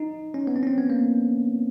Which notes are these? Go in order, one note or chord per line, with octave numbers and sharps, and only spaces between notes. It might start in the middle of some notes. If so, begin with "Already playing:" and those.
Already playing: D#4
C#4
B3
C4
C#4
C4
B3
A#3